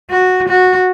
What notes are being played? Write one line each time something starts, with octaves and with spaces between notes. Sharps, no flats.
F#4
F#4